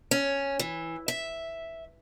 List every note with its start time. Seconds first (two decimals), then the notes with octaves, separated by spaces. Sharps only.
0.11 C#4
0.59 E3
1.08 E5